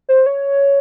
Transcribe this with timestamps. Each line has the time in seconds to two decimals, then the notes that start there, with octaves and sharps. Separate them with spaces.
0.09 C5
0.26 C#5